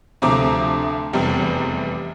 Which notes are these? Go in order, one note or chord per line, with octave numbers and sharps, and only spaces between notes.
D2 C3 F3 A3 A#5 D6
F1 E2 C3 G3